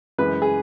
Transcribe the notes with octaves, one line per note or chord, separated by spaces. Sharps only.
F#2 E3 G#3 B4
G#4